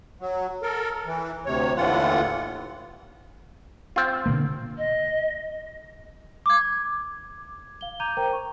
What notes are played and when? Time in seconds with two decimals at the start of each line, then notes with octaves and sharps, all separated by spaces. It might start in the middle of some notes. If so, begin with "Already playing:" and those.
0.20 F#3
0.62 A4 A#4
1.06 E3
1.46 D2 C3 C#5
1.76 D#2 A2 D3 E3 F4 F#5
3.96 C4 F4
4.26 B2 D3 A#3
4.78 D#5
6.46 D6 G#6
7.81 F5 G7
8.00 A#5 D6 G6 G#6 D#7 F7
8.17 A#4 C5 G5 A#5
8.33 C#6